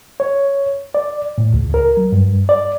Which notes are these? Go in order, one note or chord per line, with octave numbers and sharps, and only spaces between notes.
C#5
D5
A2
C#2
A#4
F#3
G2
D5